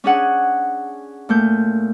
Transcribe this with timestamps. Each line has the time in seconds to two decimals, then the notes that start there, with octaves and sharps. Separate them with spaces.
0.04 C#4 D4 G#4 F#5
1.29 A#2 A3 G6